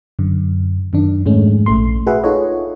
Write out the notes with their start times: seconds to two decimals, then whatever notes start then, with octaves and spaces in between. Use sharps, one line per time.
0.19 F#2 D3
0.93 F#2 D#3 D4
1.26 F2 G#2 G#3 A3 C#4
1.66 A#1 A3 C6
2.07 F#4 G#4 B4 E5 F#5
2.24 D#4 F4 G#4 A4 C#5 D#5